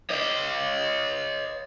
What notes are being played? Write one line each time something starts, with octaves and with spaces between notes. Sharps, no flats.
C#5 D#5